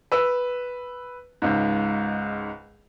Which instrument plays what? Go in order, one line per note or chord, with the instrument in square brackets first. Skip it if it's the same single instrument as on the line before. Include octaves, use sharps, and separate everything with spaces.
[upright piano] B4 E6
C#2 G#2